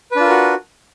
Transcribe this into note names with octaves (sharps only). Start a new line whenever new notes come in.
D4 F4 F#4 A#4 B4